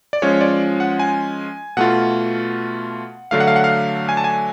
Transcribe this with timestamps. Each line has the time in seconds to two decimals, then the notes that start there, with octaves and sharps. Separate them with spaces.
0.13 D5
0.22 F3 G#3 C#4 F4 C#5
0.41 D5
0.80 F#5
1.00 G#5
1.77 B2 A3 F4 F#5
3.31 D3 F#3 A3 D4 F5
3.40 F#5
3.47 F5
3.56 F#5
3.64 F5
4.09 G#5
4.17 A5
4.24 G#5